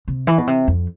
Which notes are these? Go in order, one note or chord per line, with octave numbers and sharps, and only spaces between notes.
C3
E3
B2
C3
F2